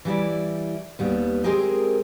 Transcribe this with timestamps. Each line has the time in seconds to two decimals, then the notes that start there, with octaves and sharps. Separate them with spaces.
0.05 E3 G3 E4 D5
0.99 D#2 G3 B3
1.44 G#3 C4 G4 G#4 A#4 D#5